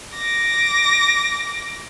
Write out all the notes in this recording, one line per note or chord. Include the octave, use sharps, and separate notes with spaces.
D6 A#6